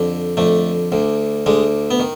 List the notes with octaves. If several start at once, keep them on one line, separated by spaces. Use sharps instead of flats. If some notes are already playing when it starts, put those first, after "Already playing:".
Already playing: F2 D3
F2 D3 A3
D2 D3
D2 D3 G#3
B3
D#3